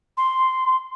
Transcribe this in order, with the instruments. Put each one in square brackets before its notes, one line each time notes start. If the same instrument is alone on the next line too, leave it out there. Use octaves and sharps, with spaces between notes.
[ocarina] C6